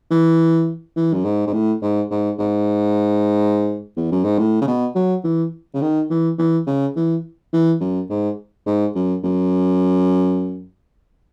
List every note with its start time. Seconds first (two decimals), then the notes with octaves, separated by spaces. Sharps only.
0.11 E3
0.97 E3
1.14 F#2
1.25 G#2
1.47 G#2
1.53 A2
1.82 G#2
2.11 G#2
2.39 G#2
3.97 E2
4.12 F#2
4.25 G#2
4.39 A2
4.62 C#3
4.67 B2
4.95 F#3
5.24 E3
5.74 C#3
5.82 D#3
6.10 E3
6.39 E3
6.67 C#3
6.96 E3
7.53 E3
7.81 F#2
8.10 G#2
8.66 G#2
8.96 F#2
9.24 F#2